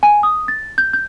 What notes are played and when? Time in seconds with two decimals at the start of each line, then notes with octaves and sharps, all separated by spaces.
0.03 G#5
0.23 D#6
0.48 A6
0.78 G6
0.93 G6